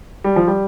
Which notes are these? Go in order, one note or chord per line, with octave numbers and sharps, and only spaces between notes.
G3
F3
G3